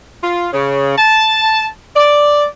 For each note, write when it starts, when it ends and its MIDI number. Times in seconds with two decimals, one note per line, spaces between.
0.22 0.47 65
0.53 0.93 49
0.98 1.65 81
1.96 2.44 74